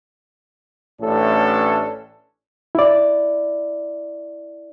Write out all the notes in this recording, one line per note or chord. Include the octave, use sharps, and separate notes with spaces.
A1 A2 C#4 D4 A4
E4 D5